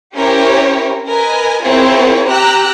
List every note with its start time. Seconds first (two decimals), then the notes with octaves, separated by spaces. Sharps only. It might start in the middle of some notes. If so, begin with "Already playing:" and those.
0.14 C#4 E4 G4 A#4 C5 C#5
1.07 A#4 B4 D#5 G#5
1.63 C4 E4 F4 G#4 A#4 C#5
2.25 G4 G5 A#5 E6 F#6